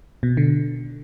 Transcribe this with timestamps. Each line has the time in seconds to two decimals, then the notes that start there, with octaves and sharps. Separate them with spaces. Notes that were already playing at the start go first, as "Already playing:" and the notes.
0.23 B2
0.37 D3